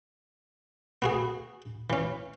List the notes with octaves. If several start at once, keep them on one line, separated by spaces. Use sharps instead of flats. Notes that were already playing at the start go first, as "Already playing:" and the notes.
B3 F#4 G#4
E3 C#4